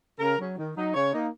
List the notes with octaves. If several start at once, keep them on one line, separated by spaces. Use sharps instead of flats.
C#3 A#4
F#3 C#4
D#3
F#3 D#4
C#3 C#5
A#3 D#4